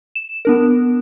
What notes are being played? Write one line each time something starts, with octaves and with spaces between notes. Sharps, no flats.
E7
B3 D4 A#4